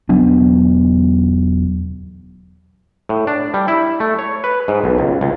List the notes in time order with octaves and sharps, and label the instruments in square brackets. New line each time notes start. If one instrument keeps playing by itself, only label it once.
[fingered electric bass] E1 F#3 B3 D4
[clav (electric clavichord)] A2
D4
G3
E4
A3
C#5
B4
G#2
B1
C#2
C#2